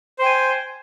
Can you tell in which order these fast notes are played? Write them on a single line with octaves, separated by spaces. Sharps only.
C5 G5 G#5